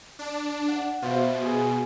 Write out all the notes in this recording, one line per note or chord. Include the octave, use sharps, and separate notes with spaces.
D4
F#5
B2 F4 C5 E5
G#4